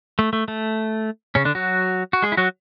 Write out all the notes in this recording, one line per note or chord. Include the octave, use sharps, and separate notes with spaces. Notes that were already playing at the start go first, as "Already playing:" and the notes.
A3
A3
A3
C#3 C#4
D3 D4
F#3 F#4
F#4
G#3 G#4
E4
F#3 F#4